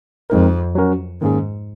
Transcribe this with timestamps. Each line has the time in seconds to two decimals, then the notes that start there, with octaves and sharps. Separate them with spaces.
0.30 F2 F3 G#3 C4 D#4 A#4
0.75 F#3 C#4 F#4 A#4
1.21 G#2 D#3 A#3 C#4 G#4